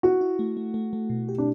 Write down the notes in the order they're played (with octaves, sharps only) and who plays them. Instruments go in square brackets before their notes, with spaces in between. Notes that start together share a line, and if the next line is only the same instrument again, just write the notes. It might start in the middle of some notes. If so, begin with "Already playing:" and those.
[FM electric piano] E4 [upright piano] F#4
[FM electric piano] E4
A3
A3
A3
A3
B2
G4
[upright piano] D4